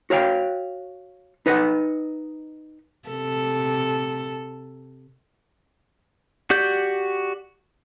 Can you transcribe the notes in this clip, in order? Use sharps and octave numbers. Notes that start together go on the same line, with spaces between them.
F#4 C#5 F5 G5
D#4 B4 D#5 F#5
C3 A4
F#4 G4 D5 G6